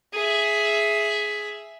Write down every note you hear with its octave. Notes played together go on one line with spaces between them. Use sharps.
G#4 E5